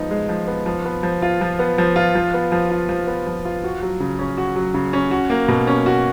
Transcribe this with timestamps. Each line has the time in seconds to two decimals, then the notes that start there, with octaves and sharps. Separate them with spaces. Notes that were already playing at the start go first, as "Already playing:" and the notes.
Already playing: F3 G#3 B3 D#4
0.11 G#3
0.29 F3
0.47 B3
0.66 F3
0.85 B3
1.03 F3
1.22 F4
1.41 F3
1.59 B3
1.78 F3
1.96 F4
2.15 F3
2.34 B3
2.52 F3
2.71 F4
2.89 F3
3.07 B3
3.27 F3
3.45 F4
3.64 F#4
3.82 F#3
4.00 C#3
4.19 C#4
4.38 F#4
4.56 F#3
4.74 C#3
4.93 C#4
5.11 F#4
5.30 A#3
5.48 B2
5.67 C#4
5.86 F#4